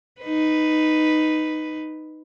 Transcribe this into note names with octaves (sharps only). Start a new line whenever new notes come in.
D#4 B4